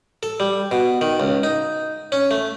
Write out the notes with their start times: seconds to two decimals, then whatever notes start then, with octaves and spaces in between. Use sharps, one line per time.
0.23 A4
0.40 G3
0.71 B2
1.01 D#3
1.20 C#2
1.43 D#4
2.12 C#4
2.31 A3